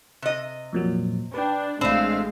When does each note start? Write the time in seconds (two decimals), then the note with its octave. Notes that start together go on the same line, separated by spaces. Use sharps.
0.22 C3 D#5
0.73 F2 A#2 F#3
1.34 D4 B4 G5
1.81 A1 G#3 A3 C4 D4 F5